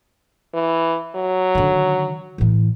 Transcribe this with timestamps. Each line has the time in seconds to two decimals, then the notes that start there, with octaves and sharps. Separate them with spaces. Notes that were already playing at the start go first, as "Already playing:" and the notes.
0.54 E3
1.15 F#3
1.55 D3 D#3
2.38 A2 E3